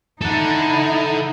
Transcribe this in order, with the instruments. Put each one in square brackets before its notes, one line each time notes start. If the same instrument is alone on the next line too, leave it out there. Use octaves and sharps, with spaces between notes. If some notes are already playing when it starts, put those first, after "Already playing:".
[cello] D#4 E4 [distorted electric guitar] A4 F#5